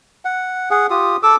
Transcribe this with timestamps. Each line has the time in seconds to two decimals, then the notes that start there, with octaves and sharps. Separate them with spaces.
0.25 F#5
0.71 G#4 F#5
0.90 F4 G4 D#6
1.23 A4 D6 E6